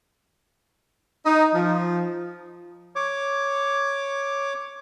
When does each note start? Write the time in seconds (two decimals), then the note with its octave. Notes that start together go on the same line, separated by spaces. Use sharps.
1.25 D#4
1.55 F3
2.96 C#5 D6